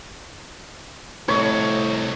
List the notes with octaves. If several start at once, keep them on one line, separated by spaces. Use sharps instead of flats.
C2 F2 A2 C#5